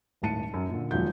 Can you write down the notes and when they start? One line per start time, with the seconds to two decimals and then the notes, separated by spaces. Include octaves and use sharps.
0.22 D#1 G#1 A2 A5 C#7 D#7
0.54 F#2
0.69 A#2 D3
0.91 E1 D#2 F3 F#3 G6